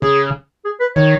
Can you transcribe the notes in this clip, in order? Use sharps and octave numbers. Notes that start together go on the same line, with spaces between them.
C#3 G#4
G#4
B4
D#3 C#5